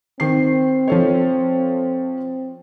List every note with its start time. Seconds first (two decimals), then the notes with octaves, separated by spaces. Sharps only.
0.20 D#3 C4 C7
0.88 F3 A4 C#5